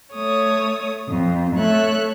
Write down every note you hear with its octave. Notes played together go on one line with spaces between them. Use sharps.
A3 C#5 D#6
F2
A3 C#5 E5 F#6